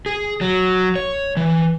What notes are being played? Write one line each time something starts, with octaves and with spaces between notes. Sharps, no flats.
G#4
F#3
C#5
E3